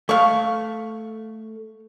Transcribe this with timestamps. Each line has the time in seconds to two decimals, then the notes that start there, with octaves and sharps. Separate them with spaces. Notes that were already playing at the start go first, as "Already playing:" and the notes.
0.09 A3 F5 C#6